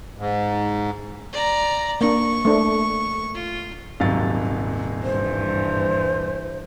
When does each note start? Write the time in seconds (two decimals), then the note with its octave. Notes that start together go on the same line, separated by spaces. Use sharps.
0.18 G#2
1.32 D5 A#5
2.01 A#3 D4 C#6
2.45 A3 D4
3.34 F4
4.00 D#1 G#1 C3 F#3 F5 A6
5.03 G2 E3 C5